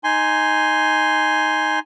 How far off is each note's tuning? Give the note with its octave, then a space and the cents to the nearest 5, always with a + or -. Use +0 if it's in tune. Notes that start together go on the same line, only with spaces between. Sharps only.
D#4 +0 G#5 +0 C6 +0